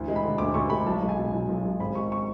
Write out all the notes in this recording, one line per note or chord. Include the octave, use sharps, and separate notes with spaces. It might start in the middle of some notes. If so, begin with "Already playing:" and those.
Already playing: D2 E3
G#3
B5
D3
D2 D6
D2 C#6
G#3 B5
B1 A5
G#3
G#5
B2
B1
B1
G#3
G#1 B5
G#3 C#6
C#6